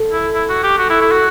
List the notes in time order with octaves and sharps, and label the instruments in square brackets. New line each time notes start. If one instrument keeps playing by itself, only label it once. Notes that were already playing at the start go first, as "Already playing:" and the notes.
Already playing: [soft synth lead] A4
[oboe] E4
E4
F#4
G4
F#4
E4
E4
F#4